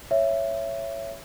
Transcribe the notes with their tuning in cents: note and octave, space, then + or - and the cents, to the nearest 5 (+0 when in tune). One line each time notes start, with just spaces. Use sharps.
C#5 +0 E5 +15